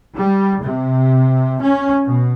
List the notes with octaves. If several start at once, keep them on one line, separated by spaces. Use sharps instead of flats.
G3
C3
C#4
B2